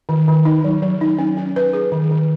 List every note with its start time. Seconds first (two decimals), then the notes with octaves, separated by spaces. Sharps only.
0.09 D#3
0.28 D#3
0.45 D#4
0.64 F#3
0.82 F#3
1.01 D#4
1.19 C#4
1.37 C#4
1.56 B4
1.73 G#4
1.92 D#3
2.11 D#3